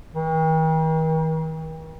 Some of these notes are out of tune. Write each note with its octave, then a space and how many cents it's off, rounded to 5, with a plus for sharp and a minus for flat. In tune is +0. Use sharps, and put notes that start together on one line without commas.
D#3 +45